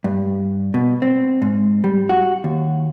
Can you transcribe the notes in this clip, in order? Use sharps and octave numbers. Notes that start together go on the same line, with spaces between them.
G2
B2
C4
G#2
G3
F#4
D#2